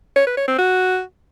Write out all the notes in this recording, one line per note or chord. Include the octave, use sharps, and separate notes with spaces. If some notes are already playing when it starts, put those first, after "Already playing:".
C#5
B4
C#5
C4
F#4